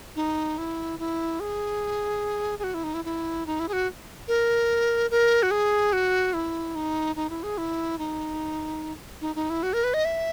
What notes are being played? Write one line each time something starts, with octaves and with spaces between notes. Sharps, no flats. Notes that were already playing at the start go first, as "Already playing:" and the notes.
D#4
E4
E4
G#4
G#4
F#4
E4
D#4
E4
E4
D#4
E4
G#4
F#4
A#4
A#4
F#4
G#4
F#4
E4
D#4
D#4
E4
G#4
E4
D#4
D#4
D#4
E4
F#4
A#4
B4
D#5
E5